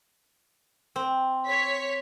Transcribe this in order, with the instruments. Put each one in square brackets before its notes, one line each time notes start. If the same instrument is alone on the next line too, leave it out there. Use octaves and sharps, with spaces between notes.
[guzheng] C4
[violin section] C#5 B6